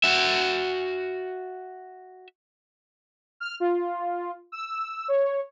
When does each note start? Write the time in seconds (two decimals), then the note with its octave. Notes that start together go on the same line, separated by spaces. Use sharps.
0.04 F#4 E5
3.40 F6
3.60 F4
4.52 E6
5.08 C#5